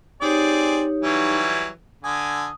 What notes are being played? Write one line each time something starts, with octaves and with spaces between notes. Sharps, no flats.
C4 D#4 G4 G#4 C#5 D5
E3 F#3 G3
D3 G#5 D#6